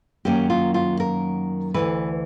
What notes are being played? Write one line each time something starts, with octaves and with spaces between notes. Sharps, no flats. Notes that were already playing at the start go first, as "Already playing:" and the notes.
F#2 D#3 F#3 A#3 C#4 G4
F4
F4
A#4
D2 C#3 E3 B4